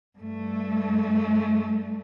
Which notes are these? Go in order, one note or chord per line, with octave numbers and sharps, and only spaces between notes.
G2 A3